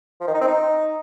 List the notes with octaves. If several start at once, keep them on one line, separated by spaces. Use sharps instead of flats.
F3
D#3
D#4
C4
D#4